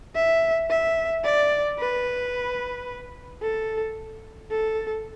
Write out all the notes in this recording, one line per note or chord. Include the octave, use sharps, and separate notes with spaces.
E5
E5
D5
B4
A4
A4